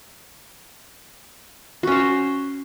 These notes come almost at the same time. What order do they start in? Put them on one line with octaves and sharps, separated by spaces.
F#4 C#4 C5 C#5